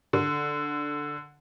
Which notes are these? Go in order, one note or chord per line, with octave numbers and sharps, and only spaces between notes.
D3